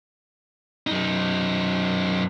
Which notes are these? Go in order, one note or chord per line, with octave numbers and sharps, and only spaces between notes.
F#2 D#4